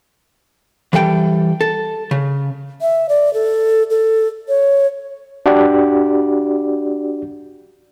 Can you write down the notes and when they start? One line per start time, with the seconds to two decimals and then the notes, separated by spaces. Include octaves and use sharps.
0.93 E3 G3 A4 F5 G5
1.61 A4
2.11 C#3
2.81 E5
3.09 D5
3.34 A4
3.90 A4
4.49 C#5
5.46 D4 F#4 G4 D5